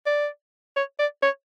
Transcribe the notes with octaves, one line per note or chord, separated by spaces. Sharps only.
D5
C#5
D5
C#5